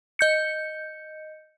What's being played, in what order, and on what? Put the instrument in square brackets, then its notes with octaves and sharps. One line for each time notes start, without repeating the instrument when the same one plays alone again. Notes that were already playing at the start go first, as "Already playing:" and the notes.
[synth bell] D#5 G6 C#7